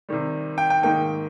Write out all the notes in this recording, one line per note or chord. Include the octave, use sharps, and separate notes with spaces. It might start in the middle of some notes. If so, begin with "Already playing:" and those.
C3 D#3 G3
G5
G5
G#2 D#3 A#3 D#4 G5